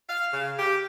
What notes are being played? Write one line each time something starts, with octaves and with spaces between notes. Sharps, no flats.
F5
C#3
G4